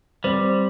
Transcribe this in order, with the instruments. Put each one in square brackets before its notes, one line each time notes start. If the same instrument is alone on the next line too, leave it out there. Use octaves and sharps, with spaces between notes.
[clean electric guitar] G3 [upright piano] C4